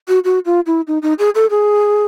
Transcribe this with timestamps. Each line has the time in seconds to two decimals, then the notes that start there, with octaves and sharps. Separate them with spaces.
0.08 F#4
0.24 F#4
0.45 F4
0.66 E4
0.87 D#4
1.02 D#4
1.19 G#4
1.35 A4
1.50 G#4